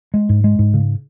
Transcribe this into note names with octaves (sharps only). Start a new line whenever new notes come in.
G#3
G#2
G#3
G#2
C#3